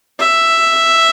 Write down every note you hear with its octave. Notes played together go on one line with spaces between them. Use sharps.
E5